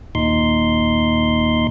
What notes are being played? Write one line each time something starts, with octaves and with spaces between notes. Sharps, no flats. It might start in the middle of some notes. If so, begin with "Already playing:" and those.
D#2 A#2 D#4 C6